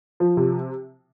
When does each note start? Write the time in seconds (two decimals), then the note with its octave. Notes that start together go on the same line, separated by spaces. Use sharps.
0.20 F3
0.37 C3